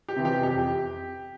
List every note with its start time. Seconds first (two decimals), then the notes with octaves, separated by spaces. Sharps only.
0.08 G4
0.16 C3 E3
0.25 G4
0.43 F2 G4